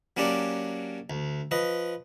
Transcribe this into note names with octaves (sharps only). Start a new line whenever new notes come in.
F#3 A#3 C#4 D4 G4 D5
D2
F3 B4 D#5